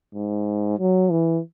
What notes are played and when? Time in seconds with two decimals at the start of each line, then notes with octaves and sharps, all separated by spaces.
0.15 G#2
0.79 F#3
1.11 E3